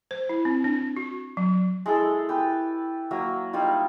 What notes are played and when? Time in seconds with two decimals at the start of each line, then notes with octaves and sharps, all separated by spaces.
0.11 C5
0.29 E4
0.45 C4
0.64 D4
0.97 F#4
1.37 F#3
1.86 G#3 E4 G#4 A4
2.29 G4 B4
3.11 F#3 A#3 E5
3.53 G3 A#3 D#4 F4